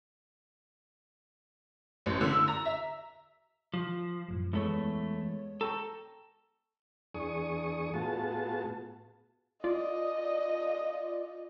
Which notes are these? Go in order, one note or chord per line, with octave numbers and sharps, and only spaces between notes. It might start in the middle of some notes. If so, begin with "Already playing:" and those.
A1
D3
E6
A#5
E5
F3
F#2 A2 F3
E2 G#3 A3 B3 C#5
A4 G5 A#5 C#6
E2 D4 G#4 C#6 D#6
A2 B3 F4 F#4 G#4 A5
F4 D5 D#5